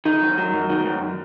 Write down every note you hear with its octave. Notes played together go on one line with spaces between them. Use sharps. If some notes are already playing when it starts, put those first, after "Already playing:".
D#3 D#4
F#2
F#3
F#2
D#3
F#2